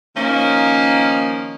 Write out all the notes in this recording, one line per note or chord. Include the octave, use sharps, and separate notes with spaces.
D#3 F3 A#3 C#4 D#4